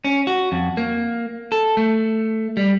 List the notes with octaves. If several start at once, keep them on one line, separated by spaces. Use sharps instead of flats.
C#4
F#4
F2
A#3
A4
A3
G3